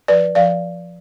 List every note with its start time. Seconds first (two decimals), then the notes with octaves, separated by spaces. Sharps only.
0.08 F3 B4 D5
0.35 F3 D5 F5